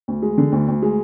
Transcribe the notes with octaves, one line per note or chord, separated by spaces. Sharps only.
D2
G#3
D3
D2
D2
G#3